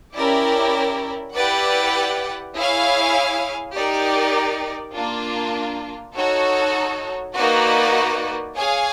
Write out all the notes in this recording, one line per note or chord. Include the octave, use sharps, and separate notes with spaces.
C#4 E4 G4 A#4 D5
E4 G4 B4 D5 F#5
E4 G#4 C#5 F5 G#5
D#4 G4 A#4 D5
A#3 D4 F4
D#4 F#4 A4 C#5
A#3 D#4 F#4 B4 D5
G#4 C#5 F5 G#5